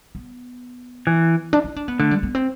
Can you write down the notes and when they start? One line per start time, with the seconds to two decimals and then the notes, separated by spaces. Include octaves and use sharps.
0.15 B3
1.07 E3
1.53 D4
1.64 E4
1.76 D4
1.88 B3
1.99 D3 A3
2.11 G3
2.23 B3
2.35 C4